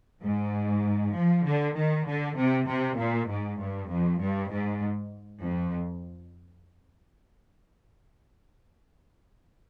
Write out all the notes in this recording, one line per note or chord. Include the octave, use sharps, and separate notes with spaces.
G#2
F3
D3
D#3
D3
C3
C3
A#2
G#2
G2
F2
G2
G#2
F2